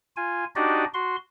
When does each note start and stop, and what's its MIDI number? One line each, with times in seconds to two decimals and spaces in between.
0.17 0.45 65
0.17 0.45 80
0.56 0.85 62
0.56 0.85 63
0.56 0.85 66
0.56 0.85 67
0.56 0.85 74
0.56 0.85 75
0.94 1.16 66
0.94 1.16 84